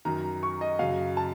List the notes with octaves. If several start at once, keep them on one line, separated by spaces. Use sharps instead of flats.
F#2 D#3 A#5
C#6
D#5
F#2 C#3 F5
A5